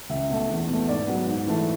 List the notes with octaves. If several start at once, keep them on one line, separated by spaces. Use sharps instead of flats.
C#2 E5
B2 A3
E2
B2
A3
G#2 D5
F#3 B3
G#2
E3 A3